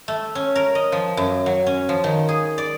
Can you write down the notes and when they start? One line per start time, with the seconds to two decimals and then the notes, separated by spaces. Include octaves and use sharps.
0.08 A3
0.35 C#4
0.55 A#4
0.75 D#5
0.92 F3
1.17 F#2
1.46 F#3
1.66 C#4
1.89 F3
2.04 D#3
2.29 G#4
2.58 D5